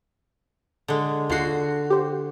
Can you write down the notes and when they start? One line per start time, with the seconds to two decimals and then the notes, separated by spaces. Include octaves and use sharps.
0.88 D3 G#3
1.30 D#2 D3 F4 F#4 C7
1.90 G4 C5